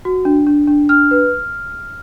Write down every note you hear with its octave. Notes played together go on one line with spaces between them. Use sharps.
F#4
D4
D4
D4
D4 F6
B4